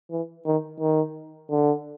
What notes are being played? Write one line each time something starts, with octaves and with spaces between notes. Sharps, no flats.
E3
D#3
D#3
D3